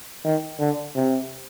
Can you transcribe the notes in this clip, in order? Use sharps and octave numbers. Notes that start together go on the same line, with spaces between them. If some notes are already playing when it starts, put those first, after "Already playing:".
D#3
D3
C3